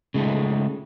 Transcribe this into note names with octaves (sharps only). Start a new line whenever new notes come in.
C#3 G#3 A3 D#4